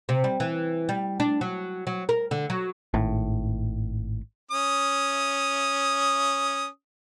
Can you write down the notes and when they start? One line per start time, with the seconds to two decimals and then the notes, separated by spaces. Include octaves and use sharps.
0.09 C3
0.24 G3
0.40 E3
0.89 G3
1.20 D4
1.41 F#3
1.87 F#3
2.09 A#4
2.31 D3
2.50 F#3
2.94 G#1 A2
4.51 C#4 D#6